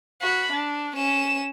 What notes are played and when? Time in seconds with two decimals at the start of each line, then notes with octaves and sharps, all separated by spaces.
0.22 F#4 B5
0.52 D4
0.95 C#4 E7